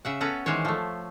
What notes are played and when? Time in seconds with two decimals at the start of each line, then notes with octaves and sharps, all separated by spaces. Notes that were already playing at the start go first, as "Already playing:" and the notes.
0.05 C#3 E5 F#5
0.21 B3 C#4 A4 B4 F#5 A#5
0.46 D#3 E3 G#3 C5 C#5
0.65 F3 A3